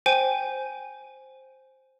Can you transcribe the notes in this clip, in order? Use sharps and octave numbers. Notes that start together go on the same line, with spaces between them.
C5 G5 G#5 D#7